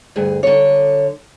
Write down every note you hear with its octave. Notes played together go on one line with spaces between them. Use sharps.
D2 G2 G#4
D3 F#3 C#5